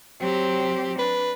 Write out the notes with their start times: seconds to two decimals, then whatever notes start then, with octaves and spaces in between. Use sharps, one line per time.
0.20 F#3 C4 G4
0.99 D4 B4